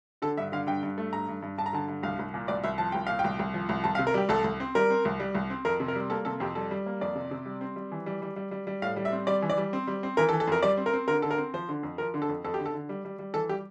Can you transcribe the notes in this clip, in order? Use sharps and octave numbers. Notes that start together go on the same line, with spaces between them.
D3 A4
G2 E5
D3 F5
G2 G5
G2
A3
G2 A#5
G2
G2
G2 A5
A#5
D3 A5
G2
C2 F5
C2
A#2
C2 D5
C2 E5
F3 A5
C2 G5
A#2 F5
G5
C2
C2
F3
C2
C2 A5
F5
C3
A#4
G3 G4
C2 A4
C2
C4
G3 A#4
C4
C2
G3
C2
C4
F2 A#4
C3
A#4
G3
A#3 A4
C3 A4
F2 G4
G3 A4
G3
A#3
F2 D5
C3
C3
G3
C4
G3
E3
G3
G3
G3
G3
G3
A2 F5
G3
E5
C4
G3 D5
E3
D5
G3
C4
G3
C4
E3 A#4
A4
E3
A4
F2 A#4
G3 D5
C4
A#4
C4
D3 A#4
D3 A4
A#4
C4
F3 C5
D3
F2
F3 A#4
D3
A4
F2
F2 A4
G4
D3
A4
D3
G3
G3
G3
E3 A4
G3 G4